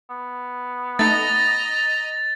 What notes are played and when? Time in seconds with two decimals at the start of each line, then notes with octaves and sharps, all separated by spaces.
0.10 B3
0.99 A3 D#4 D#5 A#5 A6